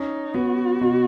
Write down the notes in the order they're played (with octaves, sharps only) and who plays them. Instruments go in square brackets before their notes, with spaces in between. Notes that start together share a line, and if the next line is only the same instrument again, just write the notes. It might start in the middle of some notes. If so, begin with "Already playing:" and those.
Already playing: [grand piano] C#4 [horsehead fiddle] D#4
[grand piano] B3 [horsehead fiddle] F#4
[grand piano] B2